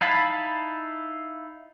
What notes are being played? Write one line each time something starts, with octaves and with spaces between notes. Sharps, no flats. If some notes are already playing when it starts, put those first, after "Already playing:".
D#4 E4 F5 A5 B5